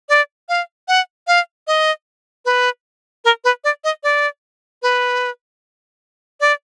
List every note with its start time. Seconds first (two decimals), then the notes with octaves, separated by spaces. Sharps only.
0.09 D5
0.49 F5
0.88 F#5
1.27 F5
1.67 D#5
2.45 B4
3.25 A#4
3.44 B4
3.64 D5
3.84 D#5
4.03 D5
4.83 B4
6.41 D5